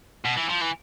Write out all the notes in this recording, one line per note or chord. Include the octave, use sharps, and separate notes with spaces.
B2
E3
F3
E3